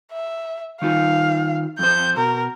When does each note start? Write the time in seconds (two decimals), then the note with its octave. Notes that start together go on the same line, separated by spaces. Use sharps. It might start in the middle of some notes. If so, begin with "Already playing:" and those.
0.13 E5
0.82 D#3 D#4 F4 F5
1.79 F2 C5 G6
2.17 B2 A#4